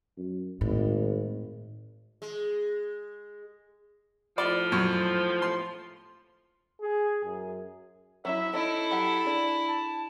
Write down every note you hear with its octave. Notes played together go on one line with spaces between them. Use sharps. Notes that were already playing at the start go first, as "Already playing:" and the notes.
F#2
G#1 A2
G#3
A2 F3 D5
F#2
C6
G#4
F#2
F#3 C#4 E4 E5
C#4 D#4 E4 A4
F#3 G4 F#5
D4 G#4
A5